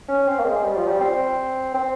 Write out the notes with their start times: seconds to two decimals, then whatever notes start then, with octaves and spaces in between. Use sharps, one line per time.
0.09 C#4
0.27 C4
0.39 A#3
0.45 G#3
0.64 G3
0.76 F3
0.88 G3
1.01 C4
1.74 C4